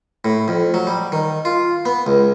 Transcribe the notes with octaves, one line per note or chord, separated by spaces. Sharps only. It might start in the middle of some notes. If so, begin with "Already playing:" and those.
A2
F2
F#3
G3
D#3
F4
B3
C#2